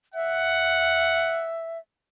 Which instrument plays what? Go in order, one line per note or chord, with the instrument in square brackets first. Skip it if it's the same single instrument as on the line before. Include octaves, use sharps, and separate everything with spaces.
[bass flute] E5 [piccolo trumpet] F#5